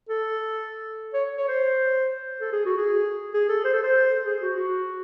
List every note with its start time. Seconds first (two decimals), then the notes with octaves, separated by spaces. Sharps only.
0.09 A4
1.14 C#5
1.37 C#5
1.48 C5
2.40 A4
2.53 G#4
2.66 F#4
2.77 G#4
3.34 G#4
3.49 A4
3.65 C5
3.74 A4
3.83 C5
4.26 G#4
4.42 F#4
4.57 F#4